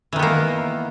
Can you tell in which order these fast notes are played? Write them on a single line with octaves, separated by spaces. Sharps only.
E3 D#3 B3 A#3